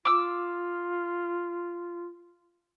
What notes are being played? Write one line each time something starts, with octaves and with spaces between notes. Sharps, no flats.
F4 D6 E6